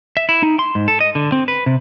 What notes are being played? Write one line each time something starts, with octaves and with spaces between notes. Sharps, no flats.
E5
E4
D#4
C6
G#2
A4
D#5
D3
C4
B4
C3